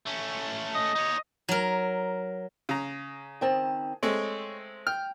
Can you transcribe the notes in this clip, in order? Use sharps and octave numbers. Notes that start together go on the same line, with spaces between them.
A3 C#4
D#5
D#4 C#5
F#3 A#4
C#3 A#5
D#3 C4 A5
G#3 A3 C4 C#5
G5 F6